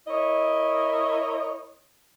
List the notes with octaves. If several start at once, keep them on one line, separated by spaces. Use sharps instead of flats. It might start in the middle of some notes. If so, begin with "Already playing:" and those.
E4 A#4 C#5 D#5